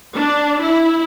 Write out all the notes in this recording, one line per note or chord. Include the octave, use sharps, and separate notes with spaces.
D4
E4